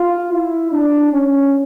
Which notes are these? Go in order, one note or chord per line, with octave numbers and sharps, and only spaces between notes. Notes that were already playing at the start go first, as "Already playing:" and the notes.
Already playing: F4
E4
D4
C#4